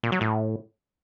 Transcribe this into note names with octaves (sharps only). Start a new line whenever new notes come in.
A#2
F#3
A2